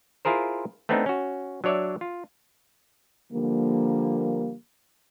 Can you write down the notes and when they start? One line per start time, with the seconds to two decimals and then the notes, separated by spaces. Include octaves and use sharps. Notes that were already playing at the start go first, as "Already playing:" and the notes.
0.25 E4 F4 G#4 A#4 C5
0.89 A3 B3 C4 D4 D#4
1.06 C#4 F#4
1.64 F#3 D4 C#5 D5 E5
2.01 F4
3.32 D3 F3 G3 A#3